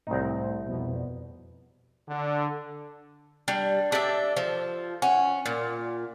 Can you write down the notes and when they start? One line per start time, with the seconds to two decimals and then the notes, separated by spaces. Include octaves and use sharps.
0.07 C2 A2 C4 D#4
0.67 F2 B2
2.08 D3
3.48 G3 D4
3.92 D4 G4 A4 D5 E5
4.37 F3
5.02 C#4 F#5
5.46 A#2